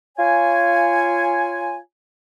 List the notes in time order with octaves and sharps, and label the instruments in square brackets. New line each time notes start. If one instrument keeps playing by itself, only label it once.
[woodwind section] F4 C#5 G#5